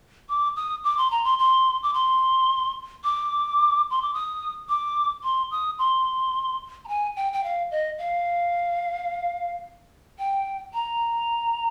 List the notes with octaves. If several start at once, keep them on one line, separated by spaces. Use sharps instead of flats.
D6
D#6
D6
C6
A#5
C6
C6
D6
C6
D6
C6
D6
D#6
D6
C6
D#6
C6
A#5
G#5
G5
G5
F5
D#5
F5
G5
A#5